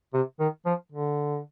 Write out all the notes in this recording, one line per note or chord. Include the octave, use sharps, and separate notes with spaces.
C3
D#3
F3
D3